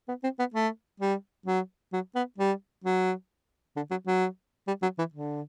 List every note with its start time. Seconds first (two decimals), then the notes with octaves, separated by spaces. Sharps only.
0.09 B3
0.24 C4
0.39 B3
0.54 A3
1.00 G3
1.46 F#3
1.93 F#3
2.15 B3
2.38 G3
2.84 F#3
3.76 D3
3.91 F#3
4.07 F#3
4.68 G3
4.83 F#3
4.99 E3
5.14 D3